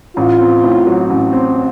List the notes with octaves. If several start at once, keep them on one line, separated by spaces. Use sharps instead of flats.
A1 F4
C4
A2
F#3
A1
C4